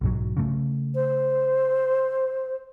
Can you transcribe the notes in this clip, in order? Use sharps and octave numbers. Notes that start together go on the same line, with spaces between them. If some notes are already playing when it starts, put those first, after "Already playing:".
B1 G#2 F#3
C#3 A3
C5